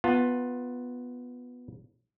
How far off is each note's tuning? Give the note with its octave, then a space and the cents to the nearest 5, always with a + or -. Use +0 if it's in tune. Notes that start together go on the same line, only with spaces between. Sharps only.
B3 +0 F4 +15 A5 +20